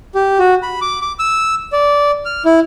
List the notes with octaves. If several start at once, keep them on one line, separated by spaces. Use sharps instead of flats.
G4
F#4
B5
D6
D6
E6
D5
F6
E4